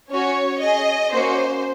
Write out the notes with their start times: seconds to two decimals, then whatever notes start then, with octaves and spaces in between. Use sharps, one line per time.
0.11 C#4 F#4 C#5
0.62 C#4 G#4 D#5
1.13 A#3 C#4 F#4 C5